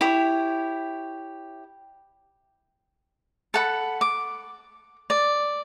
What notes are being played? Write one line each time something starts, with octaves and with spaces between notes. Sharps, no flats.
E4 G4 C#5
A4 F#5 B5
D6
D5